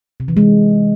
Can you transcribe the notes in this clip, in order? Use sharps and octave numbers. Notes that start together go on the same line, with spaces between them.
C3
E3
G#3